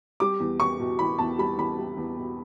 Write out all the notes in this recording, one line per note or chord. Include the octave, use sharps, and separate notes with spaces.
G3 D6
E2
E2 C#6
B2
E2 B5
E2 A5
G3 B5
E2 B5
G3
E2
B2